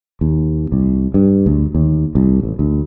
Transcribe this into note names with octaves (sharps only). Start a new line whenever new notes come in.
D#2
C2
G2
D2
D#2
C2
A1
D2